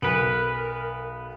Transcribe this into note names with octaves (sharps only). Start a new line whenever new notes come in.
B1 B3 A#4 B4 D7 F#7